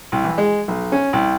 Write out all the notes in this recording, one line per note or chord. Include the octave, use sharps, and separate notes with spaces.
C2
E3
G#3
B1
C#4
C2